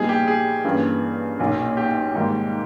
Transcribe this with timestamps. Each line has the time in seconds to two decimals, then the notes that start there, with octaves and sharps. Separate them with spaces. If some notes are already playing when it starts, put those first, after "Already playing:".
Already playing: A#1 A#2 G3 B3 D#4 G#4
0.09 G4
0.28 G#4
0.65 G2 E3 A#3 C#4
1.39 B1 A#2 A#3
1.77 G4
2.14 G#2 D#3 G3 A#3